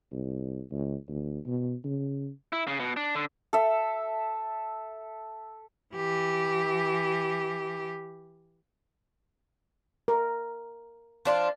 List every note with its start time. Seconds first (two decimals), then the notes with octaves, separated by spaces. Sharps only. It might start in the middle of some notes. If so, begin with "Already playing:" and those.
0.12 C2
0.71 C#2
1.08 D2
1.46 B2
1.84 C#3
2.53 E4
2.67 C#3
2.80 B2
2.97 D4
3.15 D3
3.53 A4 E5
5.95 E3 G4
10.08 A#4
11.25 F3 D4 F4